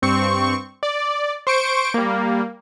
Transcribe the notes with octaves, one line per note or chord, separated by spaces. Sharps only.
G2 C4 C#6
D5
C5 C#6 D7
G3 A#3